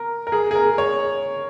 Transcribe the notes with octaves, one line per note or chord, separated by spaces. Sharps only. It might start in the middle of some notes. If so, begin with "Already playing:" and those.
Already playing: A#4
A#4
G#4
G#4
A#4
C#5